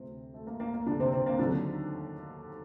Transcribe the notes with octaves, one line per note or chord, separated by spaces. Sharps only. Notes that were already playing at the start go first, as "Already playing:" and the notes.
Already playing: D2 C3 C4
A3
A#3
A#3
A#3
D3 D4
C3 C4
C3 C4
A#3
D#2 D3 D#3 F#3 D4